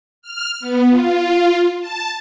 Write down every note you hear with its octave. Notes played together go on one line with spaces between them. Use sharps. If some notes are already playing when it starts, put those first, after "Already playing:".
F6
B3
F4
A5